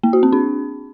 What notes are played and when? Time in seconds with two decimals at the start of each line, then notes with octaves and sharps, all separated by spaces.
0.03 A#3
0.13 F#4
0.23 C4
0.33 D4